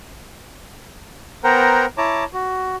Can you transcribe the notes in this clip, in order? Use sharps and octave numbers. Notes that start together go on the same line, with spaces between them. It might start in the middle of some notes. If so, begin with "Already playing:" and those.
B3 A#4 C5 F#5 G5 A#5
E4 C#5 A5 A#5 D6
F#4